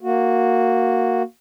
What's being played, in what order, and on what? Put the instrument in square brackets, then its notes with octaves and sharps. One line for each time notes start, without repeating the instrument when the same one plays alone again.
[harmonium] A#3 F#4